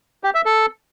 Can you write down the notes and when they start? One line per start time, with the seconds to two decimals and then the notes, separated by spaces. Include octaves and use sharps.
0.24 G4
0.34 E5
0.45 A4